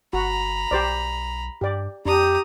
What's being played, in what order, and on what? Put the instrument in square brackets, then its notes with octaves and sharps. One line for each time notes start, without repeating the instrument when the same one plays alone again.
[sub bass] G1 [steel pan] F#4 [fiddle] A#5 B5
[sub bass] B1 [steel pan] G4 C5 D5
[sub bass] G2 [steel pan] G4 D5
[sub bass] F2 [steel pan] D4 [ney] G4 [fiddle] A#5 D#6